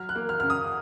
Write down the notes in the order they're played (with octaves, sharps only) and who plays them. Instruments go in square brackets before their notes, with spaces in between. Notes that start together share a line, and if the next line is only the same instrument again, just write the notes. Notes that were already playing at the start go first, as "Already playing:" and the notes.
Already playing: [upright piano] F#3 F6
F#6
A#3
F6
C#3 F6
D#6